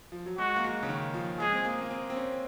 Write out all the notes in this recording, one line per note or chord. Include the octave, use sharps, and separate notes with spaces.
F3
F#3
G#3 F#4
A#3
G#3
C#3
D#3
F3
G#3 G#4
C4
A#3
A#3
C4
C4
C#4